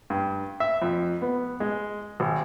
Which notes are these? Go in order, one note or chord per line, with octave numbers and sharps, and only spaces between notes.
G2
E5
F2
B3
G#3
G#1